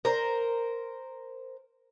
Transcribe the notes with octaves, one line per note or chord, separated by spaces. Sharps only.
A#4 C5